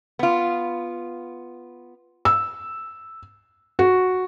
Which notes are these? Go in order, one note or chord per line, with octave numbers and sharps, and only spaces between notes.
B3 F4
E6
F#4